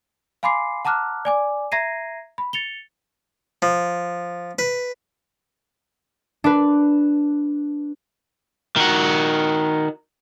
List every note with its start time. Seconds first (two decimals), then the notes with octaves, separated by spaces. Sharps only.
0.43 F5 G#5 B5 C6 D6 C7
0.85 F#5 A5 A#5 D6 F6 F#6
1.25 D5 G#5 D6
1.72 E5 A#5 G#6 A#6 C7 D#7
2.38 B5
2.53 A6 C#7 F7 G7
3.62 F3
4.59 B4
6.44 D4 B4
8.76 D#3 F#4